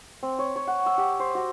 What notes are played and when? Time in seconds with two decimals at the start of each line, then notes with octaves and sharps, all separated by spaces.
0.23 C4
0.39 C#5
0.56 C#5
0.67 F#5
0.86 E6
0.98 G4
1.20 C5
1.35 F#4